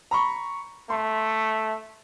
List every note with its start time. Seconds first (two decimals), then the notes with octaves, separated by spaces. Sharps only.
0.11 A#5 B5 C#6
0.90 A3 C6